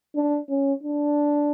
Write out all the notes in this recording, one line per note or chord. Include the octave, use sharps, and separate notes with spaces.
D4
C#4
D4